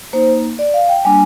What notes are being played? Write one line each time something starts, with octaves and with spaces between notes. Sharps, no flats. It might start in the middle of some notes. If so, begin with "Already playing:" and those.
A#3 D#4 C5
D5
F5
G5
G3 A#3 D4 G#5